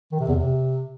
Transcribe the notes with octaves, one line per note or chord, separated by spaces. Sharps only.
D#3
C3
E2
C3